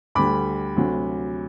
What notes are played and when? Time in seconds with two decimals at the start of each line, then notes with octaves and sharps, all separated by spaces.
0.15 D2 D3 G3 B5 D6
0.77 D2 C3 F#3